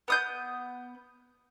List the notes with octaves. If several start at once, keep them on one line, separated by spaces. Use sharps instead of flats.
B3 D#6 G6